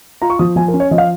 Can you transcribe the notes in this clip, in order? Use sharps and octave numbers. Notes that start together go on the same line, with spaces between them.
F4 A#5
C#6
F3 D#6
F3 G#5
A#4
C#4
C#5
F3 D#5
F5